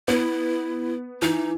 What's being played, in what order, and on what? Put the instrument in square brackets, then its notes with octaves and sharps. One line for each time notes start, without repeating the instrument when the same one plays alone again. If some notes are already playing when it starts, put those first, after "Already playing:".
[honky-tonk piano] B3 [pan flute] E4
[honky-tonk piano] E3 [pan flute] D#4